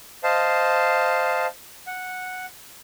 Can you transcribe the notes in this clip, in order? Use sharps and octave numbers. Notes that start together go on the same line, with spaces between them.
C5 D#5 F5 A5
F#5